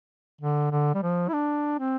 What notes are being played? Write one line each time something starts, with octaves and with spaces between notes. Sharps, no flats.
D3
D3
G3
F3
E4
D4
C4